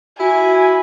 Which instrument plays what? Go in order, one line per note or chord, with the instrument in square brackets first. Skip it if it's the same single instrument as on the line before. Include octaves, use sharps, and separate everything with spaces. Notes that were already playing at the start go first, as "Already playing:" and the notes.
[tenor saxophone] E4 [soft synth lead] F#4 [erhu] G#5